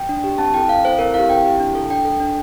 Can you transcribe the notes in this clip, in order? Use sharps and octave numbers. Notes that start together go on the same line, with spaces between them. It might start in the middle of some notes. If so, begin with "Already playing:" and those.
Already playing: G5
D4
G4
C4 A5
E4 A4 G5
C4 F5
E4 A4 C5
C4 A#4
E4 G4 F5
C4 G5
E4 G4
D4
A4
D4 G5
A4
D4